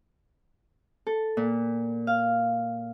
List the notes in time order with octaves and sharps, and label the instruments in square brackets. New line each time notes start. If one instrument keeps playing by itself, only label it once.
[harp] A4
A#2
F5